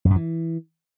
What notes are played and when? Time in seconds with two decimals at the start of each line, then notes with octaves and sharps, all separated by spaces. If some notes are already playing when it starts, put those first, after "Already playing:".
0.05 F2
0.10 F#2
0.16 E3